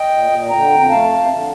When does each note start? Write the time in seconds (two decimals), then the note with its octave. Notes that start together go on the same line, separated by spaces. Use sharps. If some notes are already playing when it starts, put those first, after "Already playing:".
Already playing: D#5 G5
0.11 A#2
0.31 A#2
0.50 D3 G5 A#5
0.70 F2
0.82 A#5
0.90 A3 F5 A5
1.09 F2
1.28 D3